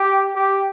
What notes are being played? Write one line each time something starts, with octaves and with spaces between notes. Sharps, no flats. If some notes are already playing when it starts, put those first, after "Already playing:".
Already playing: G4
G4